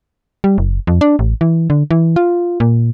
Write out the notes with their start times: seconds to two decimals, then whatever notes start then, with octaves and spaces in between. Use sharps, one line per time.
0.44 G3
0.58 F#1
0.87 F2
1.01 D4
1.19 A1
1.41 E3
1.70 D3
1.91 E3
2.16 F4
2.60 A#2